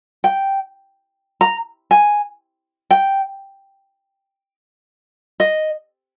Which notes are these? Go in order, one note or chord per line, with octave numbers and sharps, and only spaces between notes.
G5
A#5
G#5
G5
D#5